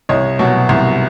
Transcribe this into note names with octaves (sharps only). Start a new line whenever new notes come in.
C2 C#5 D#5
B2 F#3
C2